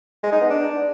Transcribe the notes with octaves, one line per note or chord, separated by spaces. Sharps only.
G#3
D#4
B3
D4